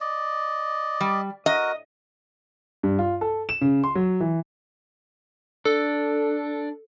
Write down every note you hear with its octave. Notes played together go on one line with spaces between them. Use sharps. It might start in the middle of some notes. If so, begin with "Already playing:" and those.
D5 D#5
G3
F#4 A#4 D#5
G2
F4
A4
E7
C#3
C6
F#3
E3
D4 A4